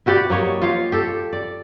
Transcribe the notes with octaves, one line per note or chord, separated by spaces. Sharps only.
E4 F#4 G4 D5
F#3 A#3 C#5 D#5
F4 G4 C#5 F5
G4 A4
D5